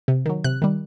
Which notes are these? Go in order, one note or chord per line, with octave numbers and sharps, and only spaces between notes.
C3
D#3 F#3
C3 F#6
D#3 G3